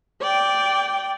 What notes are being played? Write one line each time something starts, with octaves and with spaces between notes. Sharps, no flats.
D5 G5